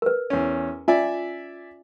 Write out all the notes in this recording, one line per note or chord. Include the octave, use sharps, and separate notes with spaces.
A#4 B4
E2 C#4
C#4 F4 D5 E5 G#5